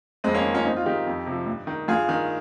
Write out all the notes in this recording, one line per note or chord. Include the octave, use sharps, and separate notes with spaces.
F2 G#3 C4
A#3 C#4
D#3
C#4 F4
G2 C4 D#4
F4
D#3 D#4 G4
F2
C3 F3
G2
D#3
G2 F4 G#4
D#3